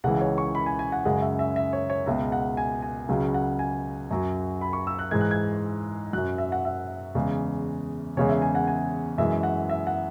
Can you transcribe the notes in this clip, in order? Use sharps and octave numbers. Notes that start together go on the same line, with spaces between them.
C#2 C#3 E3 G#3 F#5
C#5
C#6
B5
G#5
G#5
F#5
F#2 C#3 G#3 F#5
E5
E5
E5
C#5
C#5
C#2 B2 G#3 E5
F#5
G#5
G#5
C#2 C#3 F#3
F#5
G#5
F#2 F#3
B5
C#6
E6
F#6
G#2 E3 G#3 G#6
F#6
G#6
F#2 F#3 F#6
E5
F#5
E5
E2 C#3 G#3
E2 C#3 G#3 C#5
E5
G#5
F#5
G#5
F#2 E3 G#3 E5
F#5
E5
F#5